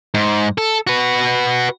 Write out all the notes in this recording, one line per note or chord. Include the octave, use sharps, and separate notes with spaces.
G#2
A4
F#4 B4